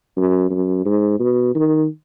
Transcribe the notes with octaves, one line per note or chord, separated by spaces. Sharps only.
F#2
F#2
G#2
B2
D#3